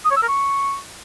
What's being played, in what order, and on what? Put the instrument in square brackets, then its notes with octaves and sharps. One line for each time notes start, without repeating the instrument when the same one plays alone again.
[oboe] D#6
C#5
E6
A#4
C#6